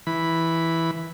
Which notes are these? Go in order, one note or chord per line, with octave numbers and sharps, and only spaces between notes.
E3 B5